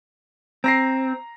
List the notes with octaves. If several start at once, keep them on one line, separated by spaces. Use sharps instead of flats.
C4 A#5 A#6 C7